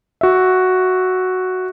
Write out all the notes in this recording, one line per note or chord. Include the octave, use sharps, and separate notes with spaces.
F#4 E5